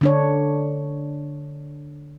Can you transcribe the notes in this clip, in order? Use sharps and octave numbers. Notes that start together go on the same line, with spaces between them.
D3 D4 C#5